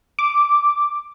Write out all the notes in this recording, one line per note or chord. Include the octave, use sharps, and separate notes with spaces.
D6